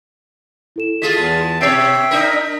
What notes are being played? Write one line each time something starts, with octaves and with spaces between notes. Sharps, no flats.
E4 A4 E7
G#3 F4 G#4 A6 B6
E2 A5
B2 C#5 E5 G5 A6 C7 D7
D4 D#4 A#4 B6